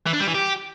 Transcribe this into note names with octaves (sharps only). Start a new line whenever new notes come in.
E3
D4
G3
E3
G4